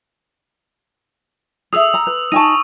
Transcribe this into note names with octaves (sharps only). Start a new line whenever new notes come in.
G#4 E5 D#6 E6 F7
A#5
B4
D#4 G#5 A5 C#6 D#7